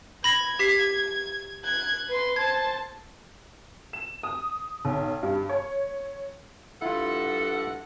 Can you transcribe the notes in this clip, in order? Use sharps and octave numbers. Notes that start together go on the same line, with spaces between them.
B5 G#6 A#6
G4 B6 C7
F#6 G#6
B4 C6
C5 A5 G#6
E7
D#6
B1
G2
C#5
G2 E4 F4 A4 F#5